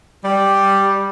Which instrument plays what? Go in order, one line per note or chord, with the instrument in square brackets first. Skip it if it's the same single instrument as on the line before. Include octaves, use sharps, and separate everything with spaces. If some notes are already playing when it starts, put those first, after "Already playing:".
[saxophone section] G3